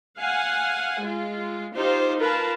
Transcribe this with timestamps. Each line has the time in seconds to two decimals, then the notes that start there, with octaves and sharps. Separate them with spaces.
0.16 F5 F#5 G#5
1.01 G#3 F4
1.75 D#4 F4 G4 C5 F5
2.19 F4 A#4 B4 A5